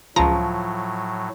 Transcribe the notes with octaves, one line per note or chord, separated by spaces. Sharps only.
C#2 A2 F3 F#3 A#5